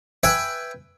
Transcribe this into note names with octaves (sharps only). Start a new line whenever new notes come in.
B4 E5 G5 G#5